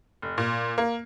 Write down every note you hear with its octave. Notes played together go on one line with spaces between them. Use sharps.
F1
A#2
A#3